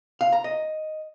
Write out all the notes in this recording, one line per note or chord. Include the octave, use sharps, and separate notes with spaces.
F5
A#5
D#5